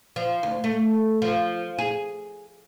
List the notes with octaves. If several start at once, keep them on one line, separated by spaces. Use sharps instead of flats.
F3
D2
A3
F3
G#4